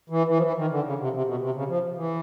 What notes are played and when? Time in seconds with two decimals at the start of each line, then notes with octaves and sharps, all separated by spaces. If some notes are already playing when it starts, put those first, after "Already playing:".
0.10 E3
0.28 E3
0.37 F3
0.43 E3
0.56 D#3
0.71 D3
0.84 C#3
0.99 C3
1.13 C3
1.26 B2
1.41 C3
1.54 C#3
1.69 F3
1.96 E3